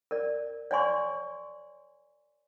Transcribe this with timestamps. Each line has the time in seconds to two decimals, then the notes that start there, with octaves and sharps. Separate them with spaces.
0.11 A#4 D5
0.71 C#5 D5 G#5 C6 C#6